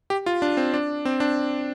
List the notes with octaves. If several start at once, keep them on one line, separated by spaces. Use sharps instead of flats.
G4
F4
D4
C4
D4
C4
D4